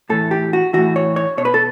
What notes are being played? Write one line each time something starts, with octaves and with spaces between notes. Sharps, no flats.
A2 E3 A4
G4
F#4
A2 E3 F#4
C#5
C#5
B2 C#5
B4
A4